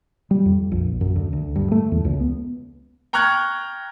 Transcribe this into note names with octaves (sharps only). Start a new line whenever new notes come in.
G3
F2
A#1
F#2
D2
D2
G2
A3
E2
C#2
B3
G5 A#5 C#6 F6 F#6 G#6